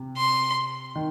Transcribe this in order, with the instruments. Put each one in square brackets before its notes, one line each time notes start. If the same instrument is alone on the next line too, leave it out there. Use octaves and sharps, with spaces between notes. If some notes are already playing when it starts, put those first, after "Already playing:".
Already playing: [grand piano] C3
[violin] C6
[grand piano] D#3